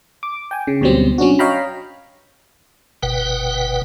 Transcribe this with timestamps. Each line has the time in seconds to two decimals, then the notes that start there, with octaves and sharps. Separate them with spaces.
0.23 D6
0.51 G5 G#5
0.67 C#3
0.81 D2 B2 F#3 G3 C4
1.18 F#3 C#4 D4 F#4
1.39 C#5 D#5 F5 G5 A#5 B5
3.03 G1 B2 B4 F#5 G5